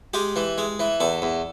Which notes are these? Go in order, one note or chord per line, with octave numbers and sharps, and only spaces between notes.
G#3 G4
E3
G#3
E3
E2 A4
E2